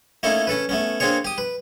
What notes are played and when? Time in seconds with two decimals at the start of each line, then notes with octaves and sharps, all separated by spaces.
0.23 A3 A#3 C#4 D#4 E4 A4
0.47 C#4 A4 B4
0.69 A3 B3 C#4
1.00 A#3 C4 D4 G#4 C#5
1.25 G4 D#6
1.38 B4